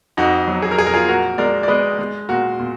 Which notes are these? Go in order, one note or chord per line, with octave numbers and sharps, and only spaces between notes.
F2 D#4 F#4
F#3
G#4
A#4
F2 G#4
A#4
F4 G#4
A#2 F#4 A#4
G#3 A#4 D5
D5
G#3 B4 D#5
G#3
A#2 F#4 A#4
A#2